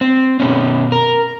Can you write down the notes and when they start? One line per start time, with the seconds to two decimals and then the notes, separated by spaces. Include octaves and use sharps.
0.01 C4
0.40 B2 B3 C#4
0.92 A#4